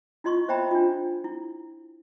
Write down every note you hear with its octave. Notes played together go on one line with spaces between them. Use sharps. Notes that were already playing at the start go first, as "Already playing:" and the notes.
E4 F4 D#5 C6 C#6
C5 D#5 E5 G5 A#5 B5
D4 F4
E4